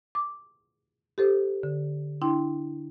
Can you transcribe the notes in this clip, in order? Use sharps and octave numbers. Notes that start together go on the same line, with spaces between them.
D6
G4 A4 C5
D3
D4 E4 G5 C6